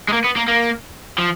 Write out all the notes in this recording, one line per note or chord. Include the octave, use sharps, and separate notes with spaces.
G#3
A#3
B3
A#3
A#3
F3